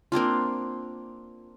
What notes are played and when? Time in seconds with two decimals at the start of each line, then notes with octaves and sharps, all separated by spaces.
0.12 A#3 C4 D4 F4